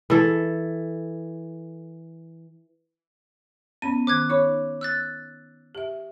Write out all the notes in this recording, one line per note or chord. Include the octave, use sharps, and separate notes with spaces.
E3 A4
B3 C#4 D#7
D#3 D6 F#6 G#6
D#4 C#5 B5
E6 F#6 A6
G4 E5